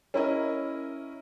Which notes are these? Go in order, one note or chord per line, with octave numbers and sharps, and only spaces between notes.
C#4 E4 A#4 D#5 E5